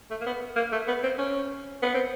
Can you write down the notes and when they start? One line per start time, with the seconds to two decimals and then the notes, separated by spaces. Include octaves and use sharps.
0.11 A3
0.21 A#3
0.26 B3
0.56 A#3
0.72 A3
0.87 B3
1.03 C4
1.18 C#4
1.82 B3
1.94 C4